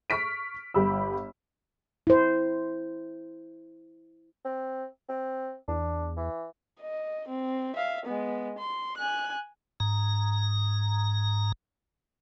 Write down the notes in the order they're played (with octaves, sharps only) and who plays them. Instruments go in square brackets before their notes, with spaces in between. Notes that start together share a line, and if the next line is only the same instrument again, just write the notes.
[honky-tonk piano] C#6 F6 B6 D7
G1 G4 B5 E6
[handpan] E4 C5
[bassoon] C4
C4
[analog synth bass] E2 [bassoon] D4
[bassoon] E3
[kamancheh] D#5
C4
E5 F5
G#3 B3
C6
G#5 F#6
[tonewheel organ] G#2 A#5